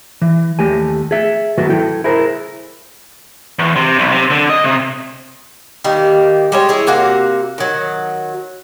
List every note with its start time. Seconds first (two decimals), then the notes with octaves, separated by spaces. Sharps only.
0.22 E3
0.59 D#2 A3 G4 G#5
1.11 G#4 E5
1.58 D#3 F#3 A3 B3 F#4
1.69 E4 A4 G5
2.04 E4 G#4 A#4 C5
3.59 E2
3.76 C3
3.99 B1
4.12 C3
4.31 D3
4.49 D#5
4.64 C3
5.84 D#3 G3 A#3
6.52 G3 G#3 C#5
6.69 E4 G#4 C#5
6.87 C3 A#3 F#4 F5
7.58 D#3 F#3